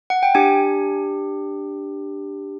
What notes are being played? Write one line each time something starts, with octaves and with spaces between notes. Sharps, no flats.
F#5
G5
D4 G4 G#5